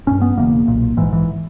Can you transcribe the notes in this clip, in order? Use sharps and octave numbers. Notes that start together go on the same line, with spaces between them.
G1 G2 C#4
B3
E1 E2 C#3 A#3
B1 A#2
A#1 G#2 E3
E3